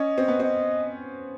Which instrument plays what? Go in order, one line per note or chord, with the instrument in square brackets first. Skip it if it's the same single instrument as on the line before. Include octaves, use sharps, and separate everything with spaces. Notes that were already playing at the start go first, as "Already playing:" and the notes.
Already playing: [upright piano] C#4 [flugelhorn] D#5
[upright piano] C4
B3
[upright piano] C4 [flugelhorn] D#5